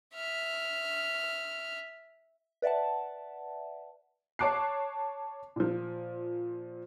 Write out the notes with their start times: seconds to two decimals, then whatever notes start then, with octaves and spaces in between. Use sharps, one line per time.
0.14 E5 F6
2.62 B4 D5 E5 F#5 A5
4.39 C#5 A5 D6 F#6 C7
5.56 A#2 F3